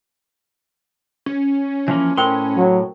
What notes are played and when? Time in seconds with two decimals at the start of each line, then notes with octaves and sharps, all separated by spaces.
1.26 C#4
1.88 E3 F3 A#3
2.17 A2 A#4 C5 G5 C6
2.56 F#3